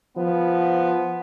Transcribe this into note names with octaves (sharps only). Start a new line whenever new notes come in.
F3 B3